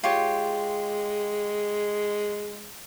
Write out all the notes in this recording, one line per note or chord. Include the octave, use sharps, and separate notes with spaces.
G#3 F4 G4 C#5